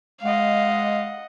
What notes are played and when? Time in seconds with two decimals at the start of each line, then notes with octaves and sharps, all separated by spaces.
0.22 G#3 D#5 F5 F#5